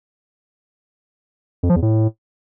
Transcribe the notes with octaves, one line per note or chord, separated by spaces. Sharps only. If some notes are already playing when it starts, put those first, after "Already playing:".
F2
F3
E2
A2